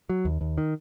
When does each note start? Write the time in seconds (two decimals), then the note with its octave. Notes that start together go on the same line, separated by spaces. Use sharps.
0.10 F#3
0.25 D#2
0.41 D#2
0.58 D#3